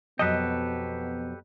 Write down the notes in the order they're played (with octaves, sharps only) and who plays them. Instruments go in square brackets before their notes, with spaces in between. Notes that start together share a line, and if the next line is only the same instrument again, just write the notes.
[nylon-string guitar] F2 B2 F#3 [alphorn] B3 [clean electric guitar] G4 A4 B4 [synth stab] D#5